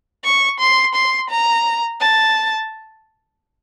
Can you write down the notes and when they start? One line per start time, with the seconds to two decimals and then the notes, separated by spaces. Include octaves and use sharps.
0.25 C#6
0.60 C6
0.95 C6
1.30 A#5
2.01 A5